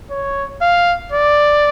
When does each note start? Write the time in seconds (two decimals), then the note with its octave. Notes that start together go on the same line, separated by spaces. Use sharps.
0.11 C#5
0.62 F5
1.12 D5